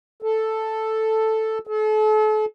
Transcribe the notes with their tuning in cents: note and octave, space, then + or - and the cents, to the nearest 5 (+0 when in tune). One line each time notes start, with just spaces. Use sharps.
A4 +0
A4 -40